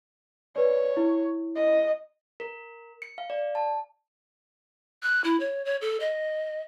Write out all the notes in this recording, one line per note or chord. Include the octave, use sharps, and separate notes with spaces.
B4 C#5 D5
E4
D#5
A#4
C#7
F5
D5
A5
F#6
E4
C#5
C#5
A4
D#5